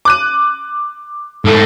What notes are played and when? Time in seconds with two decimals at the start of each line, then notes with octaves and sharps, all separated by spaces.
0.05 D6 F#6 D#7
1.45 G#2 A3 A4